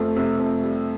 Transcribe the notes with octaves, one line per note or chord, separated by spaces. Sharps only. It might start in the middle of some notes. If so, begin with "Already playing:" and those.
Already playing: F2 A3
C3
F2
G3